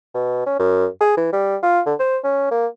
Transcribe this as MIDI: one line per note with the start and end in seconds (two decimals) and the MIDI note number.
0.14 0.42 47
0.46 0.58 61
0.59 0.86 42
1.01 1.14 68
1.17 1.31 52
1.33 1.56 55
1.63 1.81 65
1.86 1.94 50
2.00 2.18 72
2.24 2.50 61
2.51 2.67 58